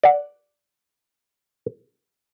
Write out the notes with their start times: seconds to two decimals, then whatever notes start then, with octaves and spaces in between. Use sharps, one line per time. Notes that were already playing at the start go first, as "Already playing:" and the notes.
0.03 D5 F#5